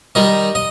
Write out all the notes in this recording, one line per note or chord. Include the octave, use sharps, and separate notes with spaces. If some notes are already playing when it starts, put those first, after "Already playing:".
D#3 G3 D#5
D#5